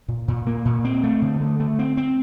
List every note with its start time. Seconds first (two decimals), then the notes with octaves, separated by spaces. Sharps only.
0.08 A#2
0.28 A#2
0.47 A#3
0.65 A#2
0.85 C4
1.04 A3
1.22 D3
1.41 A3
1.60 A3
1.79 C4
1.97 C4